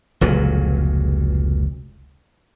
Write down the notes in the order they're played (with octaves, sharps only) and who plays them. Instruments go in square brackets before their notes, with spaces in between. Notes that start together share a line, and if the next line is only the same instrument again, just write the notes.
[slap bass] F1 C#2 A#2 F#3